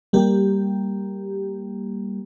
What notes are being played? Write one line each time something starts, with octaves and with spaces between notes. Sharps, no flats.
G3 A#3 G4